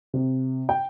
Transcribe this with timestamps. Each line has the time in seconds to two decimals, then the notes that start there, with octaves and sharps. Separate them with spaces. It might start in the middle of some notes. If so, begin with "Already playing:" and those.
0.14 C3
0.69 G5